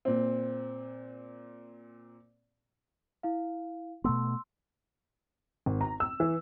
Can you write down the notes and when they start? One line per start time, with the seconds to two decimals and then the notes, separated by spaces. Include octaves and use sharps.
0.05 A#2 C4
3.23 E4 F5
4.04 B2 A3 B3 C6 E6
5.66 G#1
5.81 A#5
6.00 E6
6.20 E3